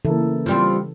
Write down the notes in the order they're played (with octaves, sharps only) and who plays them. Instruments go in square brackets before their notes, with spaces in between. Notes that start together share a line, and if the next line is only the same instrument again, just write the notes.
[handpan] C#3 E3 A4 [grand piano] A#3 E4
[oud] F3 G3 C4